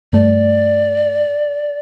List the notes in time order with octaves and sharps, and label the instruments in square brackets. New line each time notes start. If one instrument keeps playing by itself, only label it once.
[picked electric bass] G2 A3 [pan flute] D5